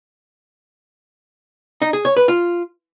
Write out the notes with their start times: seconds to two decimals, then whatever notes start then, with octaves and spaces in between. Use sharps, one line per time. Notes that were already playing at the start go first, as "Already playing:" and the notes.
1.82 D#4
1.93 G#4
2.05 C#5
2.17 B4
2.28 F4